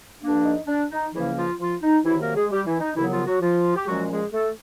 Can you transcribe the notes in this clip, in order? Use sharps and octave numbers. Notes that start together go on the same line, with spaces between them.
G2 D3 F3 A#3 D4
D#4
D4
D#4
C#2 C#3 E3 F3 A#3 C#4 E4
F3 F4
F3 F4
D#4
C3 D#3 E3 F#3 E4
A#3 A#4
G#3 G#4
G3 G4
E3 E4
D#4
D#2 C#3 E3 F#3 B3 E4
F3 F4
F#3 F#4
F3 F4
G4
A#2 F3 F#3 G#3 C#4 F#4
G#3 G#4
A3 A4